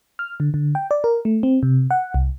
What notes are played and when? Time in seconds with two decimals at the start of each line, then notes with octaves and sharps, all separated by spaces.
0.19 F6
0.40 D3
0.54 D3
0.75 G5
0.91 D5
1.04 A#4
1.25 A3
1.43 C4
1.63 C3
1.91 F#5
2.14 C2